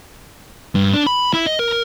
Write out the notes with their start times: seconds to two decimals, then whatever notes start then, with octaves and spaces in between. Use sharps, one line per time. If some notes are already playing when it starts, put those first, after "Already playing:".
0.75 G2
0.94 D4
1.07 B5
1.34 E4
1.46 D#5
1.59 A#4